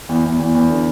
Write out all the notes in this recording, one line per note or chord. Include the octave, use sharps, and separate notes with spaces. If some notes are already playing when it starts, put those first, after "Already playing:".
E2
E2
E2
E2
D3